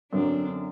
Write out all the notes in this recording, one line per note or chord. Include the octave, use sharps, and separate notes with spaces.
F#2 D3 F#3 C4 D4